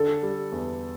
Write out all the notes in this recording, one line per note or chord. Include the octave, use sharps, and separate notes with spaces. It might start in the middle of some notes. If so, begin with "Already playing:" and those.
Already playing: D3 A4
G3
E2